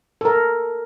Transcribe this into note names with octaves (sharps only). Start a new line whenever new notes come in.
A4 A#4